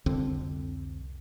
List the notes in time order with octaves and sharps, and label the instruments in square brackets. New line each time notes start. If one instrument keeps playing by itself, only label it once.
[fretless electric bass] C2 F2 D3 C4